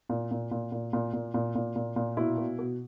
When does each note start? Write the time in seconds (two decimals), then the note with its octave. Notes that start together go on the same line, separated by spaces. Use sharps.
0.09 A#2
0.31 A#2
0.51 A#2
0.72 A#2
0.93 A#2
1.13 A#2
1.34 A#2
1.55 A#2
1.76 A#2
1.96 A#2
2.17 B2 E4
2.38 B2
2.59 B2